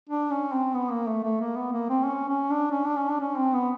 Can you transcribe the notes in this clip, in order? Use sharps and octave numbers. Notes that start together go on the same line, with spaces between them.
D4
C#4
C4
B3
A#3
A3
A3
A#3
B3
A#3
C4
C#4
C#4
D4
C#4
D4
C#4
D4
C#4
C4
B3